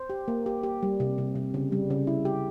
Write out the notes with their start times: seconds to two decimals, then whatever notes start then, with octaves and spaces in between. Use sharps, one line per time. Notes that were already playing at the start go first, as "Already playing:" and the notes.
Already playing: C5
0.10 G4
0.28 A#3
0.46 G4
0.63 G4
0.83 G3
1.00 C3
1.18 C3
1.35 C3
1.54 C#3
1.72 G3
1.90 C#3
2.07 E4
2.25 G4